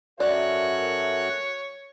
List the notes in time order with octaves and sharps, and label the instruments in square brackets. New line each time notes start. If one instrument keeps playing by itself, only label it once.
[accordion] F#2 F#4 F#6 [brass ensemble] A4 A#4 E5 [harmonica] C#5 [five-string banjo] D5